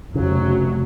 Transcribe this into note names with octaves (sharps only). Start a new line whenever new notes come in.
F1 C#3 F#3